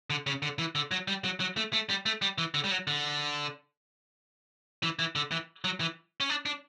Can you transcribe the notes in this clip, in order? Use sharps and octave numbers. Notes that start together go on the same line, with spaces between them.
D3
C#3
D3
E3
D3
F#3
G3
F#3
F#3
A3
A3
G3
A3
G3
E3
D3
G3
F#3
D3
E3
E3
D3
E3
F#3
E3
C#4
D4
D4